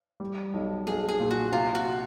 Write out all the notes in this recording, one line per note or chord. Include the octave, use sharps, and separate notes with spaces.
G3
B1
B1 G#4
G#4
A#2
F#4
C3 F4
F#4